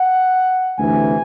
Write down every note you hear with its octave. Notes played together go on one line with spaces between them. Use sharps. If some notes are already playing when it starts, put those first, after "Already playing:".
Already playing: F#5
D2 C3 E3 G#5